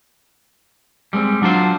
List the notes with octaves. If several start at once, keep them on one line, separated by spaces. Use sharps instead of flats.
G3 G#3 A#3 C4
F#3 D4 F4 C5